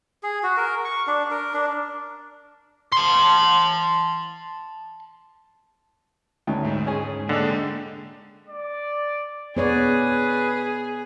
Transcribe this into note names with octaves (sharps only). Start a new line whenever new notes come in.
G#4
F#4
A#4
C#6
D4
A#4
D4
A5 C6
D2 C#4 D#4 E4
G#2 G5
C#4 G#4 G#5
D3 G#3 A#3 D#5 F#5 G5
D5
B3 G#4 B4 C#5 D5